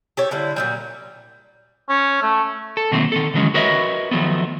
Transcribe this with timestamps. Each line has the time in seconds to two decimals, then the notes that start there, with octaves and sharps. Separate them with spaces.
0.17 G4 A4 C#5
0.31 D3 G3 E4
0.56 A#2 F#3 G3
1.89 C#4
2.22 A3
2.77 A4
2.91 B2 D#3 F#3 A3 A#3 C4
3.12 D#3 A4
3.34 D3 E3 F#3 G#3 C#4
3.54 F#4 A#4 B4 C#5 D#5 E5
4.11 D#3 F3 F#3 A3 B3